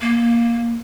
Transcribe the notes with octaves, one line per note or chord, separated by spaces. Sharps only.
A#3